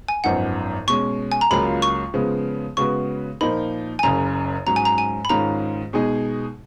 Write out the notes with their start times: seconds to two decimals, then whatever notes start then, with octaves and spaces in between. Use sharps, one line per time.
0.08 G#5
0.24 G#1 F#2 F3 B3 D#4 F#5
0.87 B2 G#3 C#4 C#6
1.32 G#5
1.41 A#5
1.51 C#2 C#3 F#3 A#3 F4 B5
1.82 C#6
2.14 C#3 F3 G#3 B3
2.77 C#3 G#3 B3 F#4 B4 C#6
3.41 A#2 F3 A#3 D#4 B5
3.99 G#5
4.03 F#1 F#2 C#3 A#5
4.66 G#2 F#3 C#4 A#5
4.76 G#5
4.85 A#5
4.98 G#5
5.25 B5
5.30 G#2 D#3 G#3 C#4 F4 A#5
5.93 B2 G#3 D#4 G#4